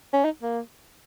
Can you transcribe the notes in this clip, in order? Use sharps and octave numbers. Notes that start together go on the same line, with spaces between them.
C#4
D#4
A#3